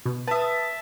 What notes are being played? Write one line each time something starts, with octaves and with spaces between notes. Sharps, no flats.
B2
B4 E5 A5 D#6